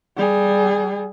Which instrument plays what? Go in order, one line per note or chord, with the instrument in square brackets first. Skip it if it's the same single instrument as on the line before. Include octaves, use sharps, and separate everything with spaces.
[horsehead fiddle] G3 G#4